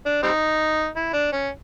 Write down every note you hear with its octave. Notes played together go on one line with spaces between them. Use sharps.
D4
G3 C4 D#4
E4
D4
C#4